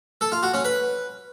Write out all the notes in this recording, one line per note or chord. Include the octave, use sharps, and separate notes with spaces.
A4
F4
F#4
C#4
B4